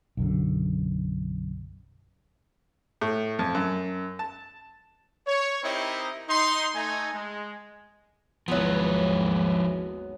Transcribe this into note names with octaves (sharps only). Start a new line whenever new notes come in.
B1 F#2 D3
A2
F2
F#2
A5
C#5
C4 D#4 E4 G4 A#4 D#5
D#4 C6
A3 D#4 G#5
G#3
G#1 D#2 F3 F#3 G#3 B3 E4